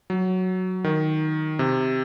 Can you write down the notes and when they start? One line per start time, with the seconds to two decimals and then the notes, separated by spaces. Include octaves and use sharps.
0.10 F#3
0.84 D#3
1.59 C3